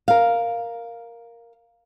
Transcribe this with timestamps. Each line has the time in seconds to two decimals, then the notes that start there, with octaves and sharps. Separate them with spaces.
0.08 A#4 F5